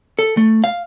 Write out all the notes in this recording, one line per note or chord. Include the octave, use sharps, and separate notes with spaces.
A4
A3
F5